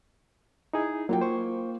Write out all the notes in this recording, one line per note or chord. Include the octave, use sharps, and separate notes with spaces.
D#4 E4 G#4
F#3 A#3 F4 G5
C5 C#6